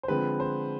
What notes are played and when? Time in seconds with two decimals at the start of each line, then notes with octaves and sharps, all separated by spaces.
0.03 C5
0.08 D3 F3 G#3 C4 B4
0.40 C5